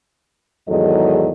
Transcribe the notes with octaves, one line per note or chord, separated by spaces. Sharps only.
E2 G#2 D#3 F#3 A4 D#5